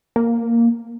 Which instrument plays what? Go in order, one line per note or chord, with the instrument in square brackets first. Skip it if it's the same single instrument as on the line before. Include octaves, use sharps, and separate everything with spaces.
[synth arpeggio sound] A#3